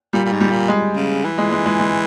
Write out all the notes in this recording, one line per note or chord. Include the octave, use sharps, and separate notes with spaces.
A#2 G3
A#2
G#2
G3
A#2
G#3
C#3
E3
G#3
G#3
G#3
G#3